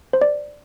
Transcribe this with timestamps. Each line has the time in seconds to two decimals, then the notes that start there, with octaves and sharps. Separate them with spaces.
0.13 C5
0.22 D5